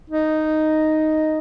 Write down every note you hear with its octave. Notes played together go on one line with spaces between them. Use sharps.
D#4